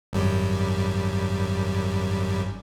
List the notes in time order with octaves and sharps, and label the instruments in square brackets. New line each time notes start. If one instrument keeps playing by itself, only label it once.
[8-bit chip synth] G#1 F#2 G3